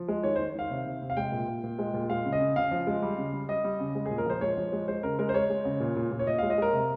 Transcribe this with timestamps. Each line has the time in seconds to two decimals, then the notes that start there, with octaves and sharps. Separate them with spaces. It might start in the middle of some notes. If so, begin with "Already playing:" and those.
Already playing: F3
0.08 G#3
0.23 D#3 C#5
0.36 D#3 C5
0.55 D#3 F5
0.70 C3
0.86 C3
1.02 C3
1.10 F5
1.17 G#3 G5
1.32 A#2
1.48 A#2
1.64 A#2
1.79 G#3
1.94 A#2
2.10 G#3 F5
2.25 C#3
2.32 D#5
2.40 C#3
2.56 C#3 F5
2.71 F3
2.87 G#3
3.02 G3
3.18 C#3
3.33 G3
3.49 G3 D#5
3.64 G3
3.80 C#3
3.95 G#3
4.06 G#4
4.11 A#2
4.18 A#4
4.26 F3 C5
4.41 G#3 C#5
4.57 F3
4.73 G#3
4.88 G#3 C5
5.03 C#3 A#4
5.19 G#3 A#4
5.29 C5
5.34 G#3 C#5
5.50 G#3
5.65 C#3
5.80 A#2
5.96 A#2
6.11 A#2
6.19 C#5
6.27 A#2 D#5
6.38 G#3 F5
6.50 D#5
6.58 G#3 A#4
6.73 C3